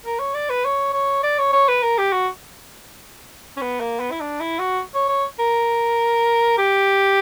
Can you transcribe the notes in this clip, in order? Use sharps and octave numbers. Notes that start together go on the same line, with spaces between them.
A#4
C#5
D5
B4
C#5
C#5
D5
C#5
C#5
B4
A#4
G4
F#4
C#4
B3
A#3
B3
E4
D4
E4
F#4
C#5
C#5
A#4
G4